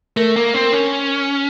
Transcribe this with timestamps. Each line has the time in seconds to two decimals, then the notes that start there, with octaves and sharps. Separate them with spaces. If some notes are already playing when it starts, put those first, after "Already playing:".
0.16 A3 A#4
0.36 A#3
0.54 C4
0.73 C#4